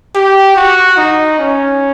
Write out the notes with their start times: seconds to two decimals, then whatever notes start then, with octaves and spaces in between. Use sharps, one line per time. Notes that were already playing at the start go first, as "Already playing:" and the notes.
0.15 G4
0.56 F#4
0.97 D#4
1.38 C#4